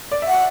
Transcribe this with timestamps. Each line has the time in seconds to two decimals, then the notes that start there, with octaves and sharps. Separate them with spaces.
0.12 D5
0.22 E5
0.28 F#5